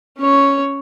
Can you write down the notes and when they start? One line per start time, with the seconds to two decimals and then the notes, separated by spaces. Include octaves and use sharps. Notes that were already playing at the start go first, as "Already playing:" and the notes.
0.18 C#4 C#5